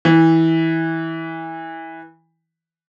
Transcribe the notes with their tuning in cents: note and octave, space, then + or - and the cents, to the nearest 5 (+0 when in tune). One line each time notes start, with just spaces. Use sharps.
E3 -20